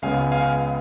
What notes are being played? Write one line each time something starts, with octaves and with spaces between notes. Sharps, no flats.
C#2 C#3 G#3 B3 F5 G#5
F5 G#5